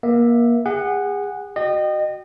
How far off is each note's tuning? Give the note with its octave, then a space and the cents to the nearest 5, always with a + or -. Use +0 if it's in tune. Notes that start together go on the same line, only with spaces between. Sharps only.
A#3 +25 E5 +0
G#4 -35 F#5 +0
F#4 +0 D#5 -30 G5 -20